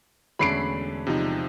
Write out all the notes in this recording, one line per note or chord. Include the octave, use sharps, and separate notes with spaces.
E1 D3 A3 C#4 B5 C7 D7
C3 F3 D#4